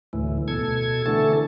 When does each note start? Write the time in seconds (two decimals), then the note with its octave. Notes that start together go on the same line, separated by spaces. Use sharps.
0.13 D2 A2 E3
0.48 B2 A4 G#6
1.06 D3 E3 A3 A4 A5